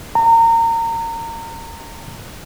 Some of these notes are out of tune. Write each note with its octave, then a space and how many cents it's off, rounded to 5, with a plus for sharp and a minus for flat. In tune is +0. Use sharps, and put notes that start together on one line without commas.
A#5 -30